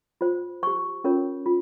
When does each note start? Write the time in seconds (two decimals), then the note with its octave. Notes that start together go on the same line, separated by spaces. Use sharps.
0.21 F4 C5
0.63 G4 C5 C#6
1.04 C#4 F4 A#4 C#5
1.46 F4